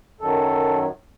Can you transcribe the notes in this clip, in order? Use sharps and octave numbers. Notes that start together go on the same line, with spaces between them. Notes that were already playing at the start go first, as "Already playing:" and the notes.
F#2 D#3 F#3 A4